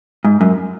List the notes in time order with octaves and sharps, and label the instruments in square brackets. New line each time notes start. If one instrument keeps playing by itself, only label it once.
[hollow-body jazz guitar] G#2
F#2